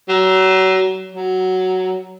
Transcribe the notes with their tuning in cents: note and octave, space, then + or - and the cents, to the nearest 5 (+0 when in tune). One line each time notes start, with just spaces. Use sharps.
F#3 +30
F#3 +5